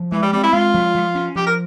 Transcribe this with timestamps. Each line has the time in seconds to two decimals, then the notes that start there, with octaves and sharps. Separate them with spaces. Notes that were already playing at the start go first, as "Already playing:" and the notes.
Already playing: F3
0.12 E3 G#3
0.22 G3
0.33 G3 C4
0.43 E4
0.53 G#3 F4
0.74 F3
0.95 F3
1.15 C#4
1.36 F3 G4
1.46 A#4